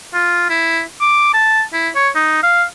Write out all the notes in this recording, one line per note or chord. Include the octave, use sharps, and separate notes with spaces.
F4
E4
D6
A5
E4
C#5
D#4
F5